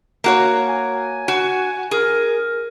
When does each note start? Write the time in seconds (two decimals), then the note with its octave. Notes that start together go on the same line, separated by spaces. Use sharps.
0.24 A#3 F#4 C#5
0.69 G#5
1.28 F#4
1.91 G#4 A#4